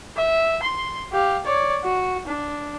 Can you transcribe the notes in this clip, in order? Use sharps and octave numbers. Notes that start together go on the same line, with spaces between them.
E5
C6
G4 F5
C#5 D5
F#4
D4